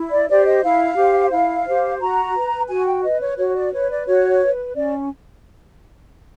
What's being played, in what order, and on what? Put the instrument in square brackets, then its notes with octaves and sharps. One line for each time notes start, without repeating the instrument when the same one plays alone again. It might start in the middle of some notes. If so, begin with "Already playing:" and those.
Already playing: [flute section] E4
D5
G4 C5 D5
D#5
E4 F5
G4 C5
E4 F5
G4 C5
F#4 A#5
B4
F#4 G#5
G5
B4 D#5
C#5
F#4 C#5
D5
B4 C#5
D5
F#4 C#5
B4
C#4 D5